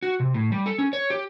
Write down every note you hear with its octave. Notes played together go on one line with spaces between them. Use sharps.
F#4
C3
A2
G3
A4
C#4
C#5
G4